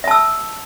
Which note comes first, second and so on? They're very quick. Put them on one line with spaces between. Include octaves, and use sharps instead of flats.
E5 A5 E6 D#6